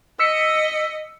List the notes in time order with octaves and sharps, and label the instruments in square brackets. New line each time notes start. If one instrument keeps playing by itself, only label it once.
[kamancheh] D#5 [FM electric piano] E6 B6 C#7